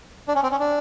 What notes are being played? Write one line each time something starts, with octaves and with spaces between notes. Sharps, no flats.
D4
C#4
C4
C#4
D4